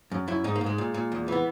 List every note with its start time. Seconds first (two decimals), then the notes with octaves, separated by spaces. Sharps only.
0.11 F#2
0.28 F#2 E4
0.44 G#2 D#4
0.56 A#3
0.61 G#2
0.66 G#3
0.78 A#2
0.94 A#2
1.12 E2
1.28 E3 B3